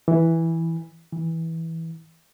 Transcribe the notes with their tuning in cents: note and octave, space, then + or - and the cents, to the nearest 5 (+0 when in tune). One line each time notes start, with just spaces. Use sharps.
E3 -5
E3 -15